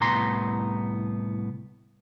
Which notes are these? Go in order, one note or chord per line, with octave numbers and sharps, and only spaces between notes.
C2 A2 B3 A#5 C6